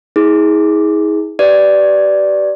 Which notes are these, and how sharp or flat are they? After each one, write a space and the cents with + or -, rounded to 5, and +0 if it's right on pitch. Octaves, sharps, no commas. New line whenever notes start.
E4 -45 G#4 +0
G4 -35 B4 +10 D5 +0